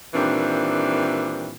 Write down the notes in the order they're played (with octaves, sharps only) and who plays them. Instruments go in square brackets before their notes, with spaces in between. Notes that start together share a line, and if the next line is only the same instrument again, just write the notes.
[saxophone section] A#2 D#3 E3 G3 C4 D4